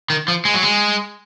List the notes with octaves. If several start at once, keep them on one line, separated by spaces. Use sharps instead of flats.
D#3
F3
G#3
F#3
G#3